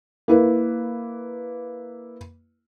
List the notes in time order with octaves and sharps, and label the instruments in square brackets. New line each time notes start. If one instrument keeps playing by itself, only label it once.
[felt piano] A#3 E4 B4